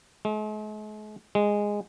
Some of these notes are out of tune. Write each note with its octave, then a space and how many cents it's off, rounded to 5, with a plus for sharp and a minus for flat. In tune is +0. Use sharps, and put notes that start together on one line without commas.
G#3 +45
G#3 -10